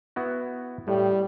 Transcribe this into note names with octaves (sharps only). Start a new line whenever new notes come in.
B3 E4 F#4
A2 G3